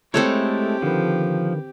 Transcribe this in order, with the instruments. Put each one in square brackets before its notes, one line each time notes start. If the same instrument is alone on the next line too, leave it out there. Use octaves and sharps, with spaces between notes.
[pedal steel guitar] G#3 A3 E4 [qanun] C4 A4 C#5 [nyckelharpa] G4
[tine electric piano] D3 D#3 B4 [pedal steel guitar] F3